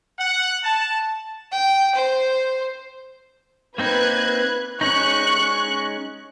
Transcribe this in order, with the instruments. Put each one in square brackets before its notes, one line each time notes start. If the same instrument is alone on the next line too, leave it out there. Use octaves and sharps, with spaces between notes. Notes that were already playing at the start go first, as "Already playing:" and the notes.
[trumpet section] F#5
A5
[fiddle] G5
C5
[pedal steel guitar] A#3 C4 D#4 [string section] B4 F#6 G#6
[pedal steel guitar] G#3 C#4 D#4 [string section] C#6 F#6